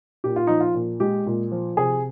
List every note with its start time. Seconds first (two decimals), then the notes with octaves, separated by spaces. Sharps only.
0.24 A#2 G4
0.36 F4
0.47 F3 D#4
0.60 F4
0.74 A#2
1.00 G#3 G4
1.26 A#2
1.51 F3
1.77 C3 G#4